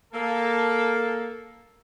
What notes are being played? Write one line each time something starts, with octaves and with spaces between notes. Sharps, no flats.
A#3 A4